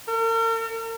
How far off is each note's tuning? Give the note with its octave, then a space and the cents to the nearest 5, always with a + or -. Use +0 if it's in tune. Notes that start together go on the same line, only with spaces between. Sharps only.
A#4 -45